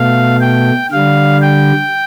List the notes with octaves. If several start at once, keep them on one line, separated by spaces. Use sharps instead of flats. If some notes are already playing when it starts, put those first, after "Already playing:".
Already playing: B2 A3 F5
G5
D3 G3 F5
G5